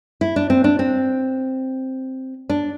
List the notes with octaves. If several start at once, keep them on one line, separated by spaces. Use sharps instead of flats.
E4
D4
C4
D4
C4
D4